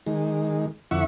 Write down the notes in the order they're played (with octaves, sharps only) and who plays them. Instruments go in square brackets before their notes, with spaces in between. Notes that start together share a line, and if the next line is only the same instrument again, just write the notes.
[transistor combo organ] D#3 G#3
F2 D3 E4 E5 F#5 C#6